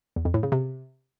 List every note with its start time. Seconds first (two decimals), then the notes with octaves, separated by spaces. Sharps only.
0.16 E2
0.25 F2
0.34 A2
0.43 C#3
0.52 C3